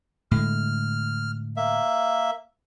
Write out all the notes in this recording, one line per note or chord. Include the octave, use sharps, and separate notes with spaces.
A2 D3 G#3 F6
A#3 E5